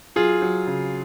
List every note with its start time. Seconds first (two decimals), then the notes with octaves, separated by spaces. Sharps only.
0.16 F#3 F4 G#4
0.42 F#3
0.67 C#3